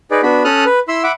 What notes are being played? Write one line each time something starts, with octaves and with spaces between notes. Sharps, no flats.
D#4 G#4 B4 D5
B3 D4 F#4 B5
C#4 A4 D#6 F6 F#6
B4
E4 B5 C6 E6
E5 F#5 B5 D6